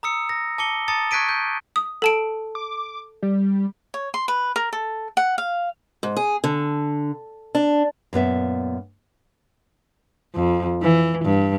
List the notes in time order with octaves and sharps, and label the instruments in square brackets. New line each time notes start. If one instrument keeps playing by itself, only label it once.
[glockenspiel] A#5 D#6 E6 C#7
A#6
A5 D6 C#7 G7
A5 A#5 D#6 A6 C#7
C#6 F#6 G#6 B6 D7 D#7
G6
[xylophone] D#6
A4 A5 D7
[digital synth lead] D6
G3
[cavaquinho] C#5
C6
B4
A#4
A4
F#5
F5
[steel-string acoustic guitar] G#2
G#4
D3
D4
[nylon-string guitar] F#2 A#2 B3 E5
[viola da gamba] F2
E3
G2